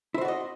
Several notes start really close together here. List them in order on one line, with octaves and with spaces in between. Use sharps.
E4 C5 F#4 D5 D#5